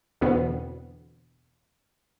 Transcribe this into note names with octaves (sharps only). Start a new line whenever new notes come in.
E2 B2 D3 B3 C4